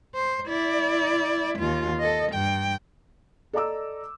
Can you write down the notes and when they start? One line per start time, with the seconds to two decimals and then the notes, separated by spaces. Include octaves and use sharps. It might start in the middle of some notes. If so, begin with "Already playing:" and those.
0.15 C5
0.48 E4 D5
1.59 D#2 F4
2.00 A4 D#5
2.32 G2 G5
3.53 A4 D5 D#5 A#5 D6 E6